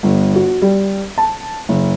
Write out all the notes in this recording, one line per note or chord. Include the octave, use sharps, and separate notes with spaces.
G1
F#4
G3
A5
F#1